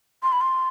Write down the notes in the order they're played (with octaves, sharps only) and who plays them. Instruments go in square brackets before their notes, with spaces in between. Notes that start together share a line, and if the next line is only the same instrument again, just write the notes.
[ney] C6
B5
C6